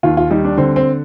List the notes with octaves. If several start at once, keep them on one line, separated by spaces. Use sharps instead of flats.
D#2 F4
F4
G3 D#4
D4
D3 C4
C4